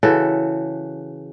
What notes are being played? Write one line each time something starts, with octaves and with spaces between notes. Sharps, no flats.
C#3 E3 F#4 A4